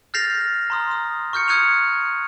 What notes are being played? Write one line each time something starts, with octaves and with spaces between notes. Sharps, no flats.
F6 G6 A6 A#6 C7 F7
A#5 C6 D#6
D#6
C#6 F6 G6 C#7
D#6 F#6 G#6 C#7 D#7 F7